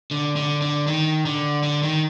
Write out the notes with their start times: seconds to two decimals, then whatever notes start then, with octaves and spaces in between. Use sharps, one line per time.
0.11 D3
0.36 D3
0.62 D3
0.87 D#3
1.26 D3
1.63 D3
1.83 D#3